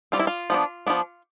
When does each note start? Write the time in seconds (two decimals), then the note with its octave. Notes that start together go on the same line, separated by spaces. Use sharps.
0.12 G3 C4 F4
0.20 E4
0.27 F4
0.50 F3 B3 D4
0.87 F3 B3 D4